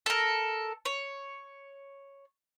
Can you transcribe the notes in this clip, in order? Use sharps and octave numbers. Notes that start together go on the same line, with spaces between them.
A4 A#4
C#5